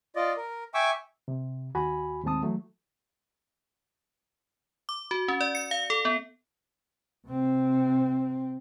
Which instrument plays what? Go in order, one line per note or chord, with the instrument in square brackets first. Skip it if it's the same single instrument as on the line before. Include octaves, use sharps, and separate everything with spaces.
[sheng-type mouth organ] F4 D5 D#5
A#4
E5 G5 G#5 C#6 D6 E6
[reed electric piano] C3
D#2 F#4 G#5 B5
D#2 A2 G#3 C4 A5 D#6
E3 F#3 A3
[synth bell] D6
F#4
C#4
D5
C#7
F5
A4
B3
[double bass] C3 C4